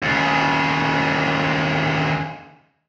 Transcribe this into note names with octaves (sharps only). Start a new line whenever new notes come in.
D#2 C#3